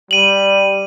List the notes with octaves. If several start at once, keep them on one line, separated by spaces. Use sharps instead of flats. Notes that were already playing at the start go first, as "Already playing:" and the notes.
G3 D#7 F#7